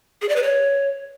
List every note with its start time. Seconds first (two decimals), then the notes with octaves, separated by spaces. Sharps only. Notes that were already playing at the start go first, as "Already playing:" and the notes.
0.22 G#4
0.29 D5
0.36 B4
0.43 C#5